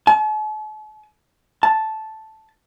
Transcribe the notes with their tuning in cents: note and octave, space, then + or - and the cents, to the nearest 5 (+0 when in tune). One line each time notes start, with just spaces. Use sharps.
A5 -45
A5 -5